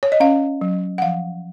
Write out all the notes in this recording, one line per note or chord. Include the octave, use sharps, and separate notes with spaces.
C#5
D#5
C#4 F5
F#3
F#5
F3 F5